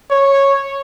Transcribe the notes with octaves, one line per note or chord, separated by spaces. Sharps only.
C#5